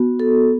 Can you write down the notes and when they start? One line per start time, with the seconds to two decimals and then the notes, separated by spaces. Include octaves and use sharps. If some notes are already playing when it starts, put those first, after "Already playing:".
Already playing: B3 F#4
0.20 A4